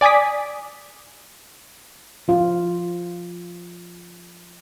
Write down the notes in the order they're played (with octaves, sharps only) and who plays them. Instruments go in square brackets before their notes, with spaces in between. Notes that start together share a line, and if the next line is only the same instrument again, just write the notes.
[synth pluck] D5 G#5 D6 D#6 B6
[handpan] F3 F4